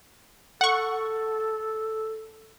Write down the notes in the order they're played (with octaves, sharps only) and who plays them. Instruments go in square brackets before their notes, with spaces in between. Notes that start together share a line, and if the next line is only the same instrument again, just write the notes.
[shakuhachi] A4 [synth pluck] F#5 C#6